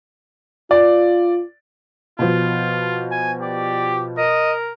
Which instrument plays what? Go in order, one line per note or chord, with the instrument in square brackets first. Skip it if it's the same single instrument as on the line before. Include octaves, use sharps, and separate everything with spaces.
[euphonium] F4 [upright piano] D5
[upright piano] B2 F3 [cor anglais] F4
[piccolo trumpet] G#5
[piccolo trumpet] G4 [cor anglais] D5
[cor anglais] A#4 [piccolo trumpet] D#5